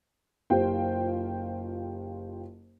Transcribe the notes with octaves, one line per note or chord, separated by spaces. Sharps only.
F#1 F4 G4 C5 G5